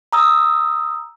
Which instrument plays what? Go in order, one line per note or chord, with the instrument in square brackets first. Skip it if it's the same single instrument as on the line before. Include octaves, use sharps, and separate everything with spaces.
[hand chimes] A#5 D#6 E6